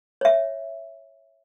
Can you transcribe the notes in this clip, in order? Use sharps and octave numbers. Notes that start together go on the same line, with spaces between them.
C#5 E5